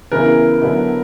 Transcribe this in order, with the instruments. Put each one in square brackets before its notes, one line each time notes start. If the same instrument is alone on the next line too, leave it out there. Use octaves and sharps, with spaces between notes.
[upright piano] C#3 E3 B3 E4 [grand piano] A#4
[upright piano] D3 F#3 B3 E4